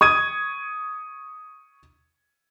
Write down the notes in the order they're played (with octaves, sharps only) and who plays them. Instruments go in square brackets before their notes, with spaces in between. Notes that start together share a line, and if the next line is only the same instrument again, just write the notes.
[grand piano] C#6 D#6 G#6 D#7